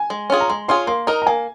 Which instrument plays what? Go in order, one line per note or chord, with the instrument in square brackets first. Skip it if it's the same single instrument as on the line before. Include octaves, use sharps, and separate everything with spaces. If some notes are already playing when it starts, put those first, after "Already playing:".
Already playing: [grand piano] G#5
[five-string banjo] G#3
C#4 F4 G#4
[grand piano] A#5
[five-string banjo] G#3 [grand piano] C6
[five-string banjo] C#4 F4 G#4 [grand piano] C6
[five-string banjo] A#3 [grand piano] C6
[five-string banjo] D#4 A#4 D#5 [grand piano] A#5
[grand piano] A#5
[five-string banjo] A#3 [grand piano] G#5